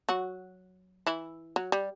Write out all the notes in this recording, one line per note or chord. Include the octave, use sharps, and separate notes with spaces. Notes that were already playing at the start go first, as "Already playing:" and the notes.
F#3 F#4
E3 E4
F#3
G3